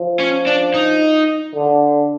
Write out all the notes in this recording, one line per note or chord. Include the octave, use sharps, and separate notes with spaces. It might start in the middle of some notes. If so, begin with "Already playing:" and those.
Already playing: F3
C#4
D4
D#4
D3